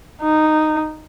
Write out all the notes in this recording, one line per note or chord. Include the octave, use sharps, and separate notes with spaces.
D#4